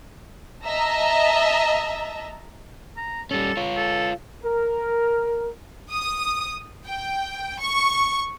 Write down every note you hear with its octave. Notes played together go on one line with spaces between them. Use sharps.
D#5 E5 A5 A#5
A#5
G3 C#4 A4
F4 C#5
A4
A#4
D#6
G5
C#6